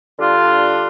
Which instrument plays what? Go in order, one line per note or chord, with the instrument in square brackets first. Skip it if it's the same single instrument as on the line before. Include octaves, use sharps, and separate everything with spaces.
[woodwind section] D3 G3 D4 F4